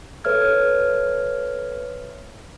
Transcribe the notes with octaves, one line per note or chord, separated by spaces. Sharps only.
A4 B4 C#5 E5 F6 G#6